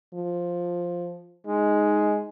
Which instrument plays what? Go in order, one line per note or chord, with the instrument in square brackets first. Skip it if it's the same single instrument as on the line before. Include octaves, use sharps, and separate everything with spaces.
[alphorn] F3
[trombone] G#3 [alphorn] D#4